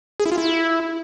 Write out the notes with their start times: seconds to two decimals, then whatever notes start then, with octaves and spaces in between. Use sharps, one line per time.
0.20 G#4
0.26 E4
0.32 F4
0.38 E4